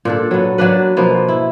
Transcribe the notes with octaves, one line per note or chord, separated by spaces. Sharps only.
A#2 D4 A4
F#3 B3
F#3 A#3 D4 B4
B2 F3 A#3 B3
E4